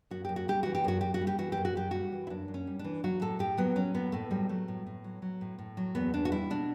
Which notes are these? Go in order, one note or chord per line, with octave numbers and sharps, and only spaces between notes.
F#2 F#4
F#2 G4
F#4
G3 G4
E3 F#4
G4
F#2 F#4
F#2 G4
F#4
G3
G4
E3 F#4
F#2 G4
F#4
F#2 G4
G3 F#4
E3
E4
F#2 D4
F#2
C#4
G3
D4
E3
F#3 F#4
A2 A4
A2 G4
F#3 B3
F#3 C#4
A2 B3
A2 A3
F#3 G3
F#3 A3
A2
A2
F#3
F#3
A2
A2
F#3
E2 B3
E2 D4
F#4
G3 E4
B2 D4